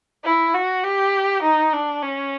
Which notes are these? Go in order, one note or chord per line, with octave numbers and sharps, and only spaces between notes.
E4
F#4
G4
D#4
D4
C#4